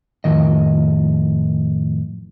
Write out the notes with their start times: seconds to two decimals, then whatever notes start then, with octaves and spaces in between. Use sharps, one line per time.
0.24 F2 A2 D#3 D#5